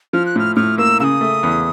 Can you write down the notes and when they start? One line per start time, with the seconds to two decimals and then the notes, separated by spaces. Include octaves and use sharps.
0.13 F3 F6
0.26 F#6
0.36 A2 F6
0.56 A2 F6
0.78 A#3 E6
1.00 C#3 D#6 E6
1.21 A3
1.43 E2